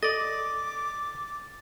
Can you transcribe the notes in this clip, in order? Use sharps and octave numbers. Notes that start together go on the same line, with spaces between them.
A4 D5 D#5 D6 A6